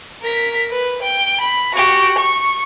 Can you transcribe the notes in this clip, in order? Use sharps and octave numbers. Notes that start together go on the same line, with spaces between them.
A#4 B6
B4
G5
B5
F#4 G4
C#6